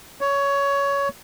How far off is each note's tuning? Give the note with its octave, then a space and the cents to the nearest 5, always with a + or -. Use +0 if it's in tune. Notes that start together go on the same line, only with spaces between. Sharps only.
C#5 +15